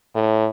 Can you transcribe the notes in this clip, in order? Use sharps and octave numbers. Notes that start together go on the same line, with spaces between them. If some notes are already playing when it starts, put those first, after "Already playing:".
A2